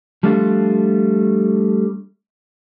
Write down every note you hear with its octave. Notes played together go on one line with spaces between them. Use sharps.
F3 G3 A3 D4 F4